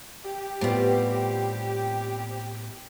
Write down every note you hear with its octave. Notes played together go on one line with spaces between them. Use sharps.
G4
A2 G3 B3 C4 F4